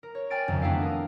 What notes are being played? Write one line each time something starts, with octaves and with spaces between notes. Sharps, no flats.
A#4
C#5
D5 G5 G#5 F6 A6 D7
F#1 C2 F2 D#3
A3 B3 D4 E4 A4 F5
A#4 D#6